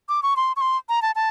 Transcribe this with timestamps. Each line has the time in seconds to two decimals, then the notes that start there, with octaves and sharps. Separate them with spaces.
0.09 D6
0.23 C#6
0.36 C6
0.56 C#6
0.61 C6
0.89 A#5
1.02 A5
1.15 A5